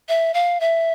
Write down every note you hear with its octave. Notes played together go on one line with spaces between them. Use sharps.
E5
F5
E5